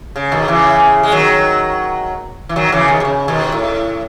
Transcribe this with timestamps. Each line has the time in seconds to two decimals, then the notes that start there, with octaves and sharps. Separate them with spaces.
0.16 C#3
0.32 B2 D#3
0.48 C#3 E3
1.03 G#3
1.12 D#3 F#3
2.49 E3
2.56 D#3 F#3
2.72 C#3 E3
2.88 B2 D#3
3.00 B2
3.05 C#3
3.28 B2 D#3
3.52 A2